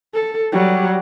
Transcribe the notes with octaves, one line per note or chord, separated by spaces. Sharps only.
A4
F#3 G3